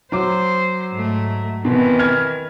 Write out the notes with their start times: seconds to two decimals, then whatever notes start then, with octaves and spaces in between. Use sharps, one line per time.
0.12 F#3 C5 D6
0.93 G#2 A3
1.65 B2 D#3 E3 C4
1.99 F6 G#6